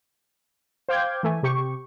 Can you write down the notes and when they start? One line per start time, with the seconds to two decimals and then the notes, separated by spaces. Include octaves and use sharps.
0.89 C5 F5 G5 D6 G6 G#6
1.23 E3 A3 G#5
1.43 C3 G4 C#6